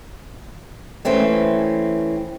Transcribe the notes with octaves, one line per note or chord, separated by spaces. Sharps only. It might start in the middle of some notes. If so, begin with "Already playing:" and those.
E3 A3 C4 C#4